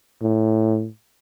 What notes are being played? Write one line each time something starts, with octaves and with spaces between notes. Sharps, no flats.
A2